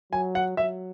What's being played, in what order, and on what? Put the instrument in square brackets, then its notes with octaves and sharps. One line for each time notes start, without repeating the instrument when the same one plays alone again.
[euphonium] F#3 [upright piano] G#5
[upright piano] F#5
[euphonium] F#3 [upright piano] E5